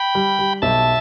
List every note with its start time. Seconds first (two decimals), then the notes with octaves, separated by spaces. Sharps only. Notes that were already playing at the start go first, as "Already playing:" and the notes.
Already playing: G5 B5
0.15 G3
0.39 G3
0.62 B1 E5 A5